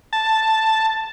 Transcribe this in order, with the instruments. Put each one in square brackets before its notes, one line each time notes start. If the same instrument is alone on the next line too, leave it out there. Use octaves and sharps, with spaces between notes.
[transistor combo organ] A5